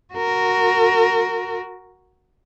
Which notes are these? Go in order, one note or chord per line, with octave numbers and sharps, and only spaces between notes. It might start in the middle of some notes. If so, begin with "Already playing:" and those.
F#4 A#4